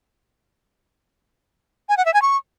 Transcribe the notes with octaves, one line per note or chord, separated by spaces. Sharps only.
G#5
F#5
E5
G#5
C#6